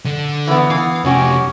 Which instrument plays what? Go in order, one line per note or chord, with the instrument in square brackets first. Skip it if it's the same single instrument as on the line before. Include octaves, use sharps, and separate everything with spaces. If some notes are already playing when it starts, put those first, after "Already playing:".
[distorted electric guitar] D3
[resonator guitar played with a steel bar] E3 B3
[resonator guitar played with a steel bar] E3 B3 [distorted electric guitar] F5
[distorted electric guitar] F2 C3 [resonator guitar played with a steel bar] C#4 F#4 G4